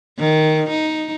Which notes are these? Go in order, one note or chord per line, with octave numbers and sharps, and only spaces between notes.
D#3
D#4